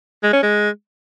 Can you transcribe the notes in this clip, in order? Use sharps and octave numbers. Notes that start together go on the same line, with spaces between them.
G#3
C#4
G#3